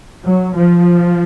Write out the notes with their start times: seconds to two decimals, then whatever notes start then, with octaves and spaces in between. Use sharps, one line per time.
0.22 F#3
0.56 F3